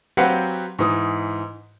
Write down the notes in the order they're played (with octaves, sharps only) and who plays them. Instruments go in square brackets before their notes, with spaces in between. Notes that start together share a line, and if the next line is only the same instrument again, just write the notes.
[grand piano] F#3 C4 G4 B4 F5 F#5
G#2 E3 D#6